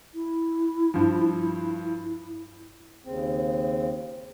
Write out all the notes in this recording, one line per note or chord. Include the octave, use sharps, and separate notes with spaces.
E4
G2 F3
D#2 C#3 C4